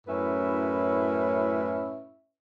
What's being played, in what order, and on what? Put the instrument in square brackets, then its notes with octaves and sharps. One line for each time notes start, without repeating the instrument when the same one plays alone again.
[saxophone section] F#2 A2 C#4 E4 B4 E5